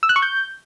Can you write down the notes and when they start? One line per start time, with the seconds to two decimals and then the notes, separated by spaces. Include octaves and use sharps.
0.03 E6
0.09 F#6
0.16 C#6
0.22 G6